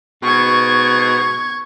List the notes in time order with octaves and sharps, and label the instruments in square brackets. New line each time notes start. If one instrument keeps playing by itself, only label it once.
[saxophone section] G#2 B2 [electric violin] C#6 G#6